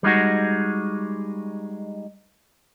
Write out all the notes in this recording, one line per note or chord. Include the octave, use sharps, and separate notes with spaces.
G3 G#3 D#4 F#4